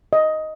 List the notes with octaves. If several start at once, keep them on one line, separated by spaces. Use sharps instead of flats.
D#5